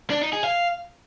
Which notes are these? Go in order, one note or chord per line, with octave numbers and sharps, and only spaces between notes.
D4
D#4
G#4
F5